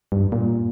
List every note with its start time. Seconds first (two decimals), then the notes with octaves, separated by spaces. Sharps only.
0.12 G2
0.32 A#2